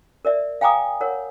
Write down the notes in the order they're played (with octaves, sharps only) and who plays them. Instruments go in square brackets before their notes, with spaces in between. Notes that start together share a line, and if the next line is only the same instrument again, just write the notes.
[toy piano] A#4 D5 E5
F5 G5 G#5 A#5 D6 D#6
A#4 C#5 F#5